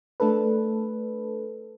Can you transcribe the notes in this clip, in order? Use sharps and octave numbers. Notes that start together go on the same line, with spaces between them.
A3 D4 A4 B4